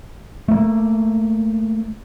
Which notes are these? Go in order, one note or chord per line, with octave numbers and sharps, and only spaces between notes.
A3 A#3